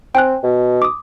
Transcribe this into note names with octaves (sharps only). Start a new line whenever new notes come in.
C4 G5 G#5 F#6
B2
D6 D#6